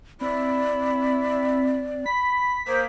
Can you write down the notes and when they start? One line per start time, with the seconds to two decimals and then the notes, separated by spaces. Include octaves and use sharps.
0.21 C4 E4 D5 B5
2.06 B5 B6
2.68 A#3 G#4 C5